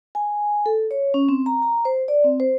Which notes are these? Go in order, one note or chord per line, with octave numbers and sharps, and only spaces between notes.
G#5
A4
C#5
C#4
C4
A#5
A#5
C5
D5
C4
C5